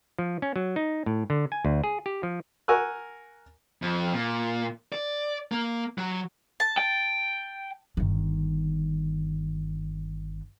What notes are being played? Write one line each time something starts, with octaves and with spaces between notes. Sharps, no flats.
F3
C#4
F#3
D#4
A2
D3
G#5
D2
G#4
G4
F3
A#4 F#5 G#5 C#6 E6 F#6
F2
A#2
D5
A#3
F#3
A5
G5
G1 D#3